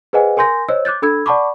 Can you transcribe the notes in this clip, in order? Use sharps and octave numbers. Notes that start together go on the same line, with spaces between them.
G#4 B4 C5 D#5 F#5 G#5
A#4 G#5 C6 G6 A#6
C5 C#5 D#5 E6
D6 F#6 G6 A6
D4 A4 B5 E6 G#6
D5 F#5 A5 B5 C#6 D6